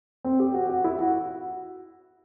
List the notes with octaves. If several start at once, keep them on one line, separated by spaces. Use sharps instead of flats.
C4
G4
F#4
F#4
E4
F#4